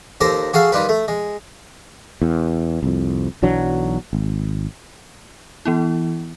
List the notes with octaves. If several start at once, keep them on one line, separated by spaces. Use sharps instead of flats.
D#2 G4 A4 C5 A#5
F#4 G#4 A4 F5 A5
D#3 G3 F4 B4
A3
G#3
E2
C2 F2
B1 E3 F#3 D4
G#1
E3 B3 E4